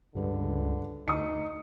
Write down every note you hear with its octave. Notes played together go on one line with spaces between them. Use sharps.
C#2 G2 D3 B4
D2 D#4 D#6 C#7